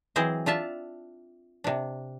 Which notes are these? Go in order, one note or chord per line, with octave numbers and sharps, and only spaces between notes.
E3 F#3 C4 G#4 C5 D#5
D4 F4 E5 A5
C3 D4